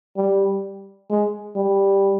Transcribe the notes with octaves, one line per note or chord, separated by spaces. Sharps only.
G3
G#3
G3